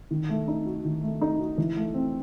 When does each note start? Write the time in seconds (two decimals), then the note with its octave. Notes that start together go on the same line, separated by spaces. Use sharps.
0.11 D#3
0.29 A3
0.48 D#4
0.66 F#4
0.85 D#3
1.03 A3
1.21 D#4
1.39 F#4
1.58 E3
1.76 A3
1.94 C4